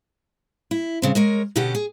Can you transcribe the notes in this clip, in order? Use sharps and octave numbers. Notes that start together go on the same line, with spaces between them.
E4
G2 C#3 C4
G#3 A#4 C#5
B2 D3 B3 C#4 G4 A4
G#4